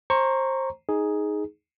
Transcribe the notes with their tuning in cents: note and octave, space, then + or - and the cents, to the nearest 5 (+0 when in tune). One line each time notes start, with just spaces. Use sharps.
C5 +25 A#5 +0 C#6 +5
D#4 +5 G#4 +5